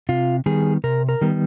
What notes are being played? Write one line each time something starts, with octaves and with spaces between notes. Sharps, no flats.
C3 F4
D#3 G3 B3 G#4
C3 A#4
A#4
D#3 G3 B3